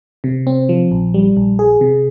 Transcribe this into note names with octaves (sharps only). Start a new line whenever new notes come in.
C3
C4
F3
A#1
G3
A#1
G#4
C3